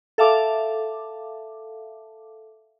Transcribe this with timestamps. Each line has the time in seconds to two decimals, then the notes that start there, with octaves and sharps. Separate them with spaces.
0.18 A4 E5 F5 A5 D6